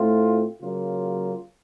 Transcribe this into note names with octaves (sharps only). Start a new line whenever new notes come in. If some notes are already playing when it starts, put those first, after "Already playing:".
Already playing: A2 A3 C4 F4
C#3 F#3 A#3 F4